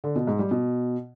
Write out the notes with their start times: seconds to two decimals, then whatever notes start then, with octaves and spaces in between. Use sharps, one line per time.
0.04 D3
0.15 B2
0.27 G#2
0.39 G3
0.51 B2